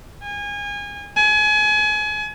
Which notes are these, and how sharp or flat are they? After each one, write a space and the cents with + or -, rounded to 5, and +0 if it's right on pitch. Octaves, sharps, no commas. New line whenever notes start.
G#5 -30
G#5 +30